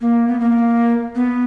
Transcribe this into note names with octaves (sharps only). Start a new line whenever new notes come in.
A#3
B3
A#3
B3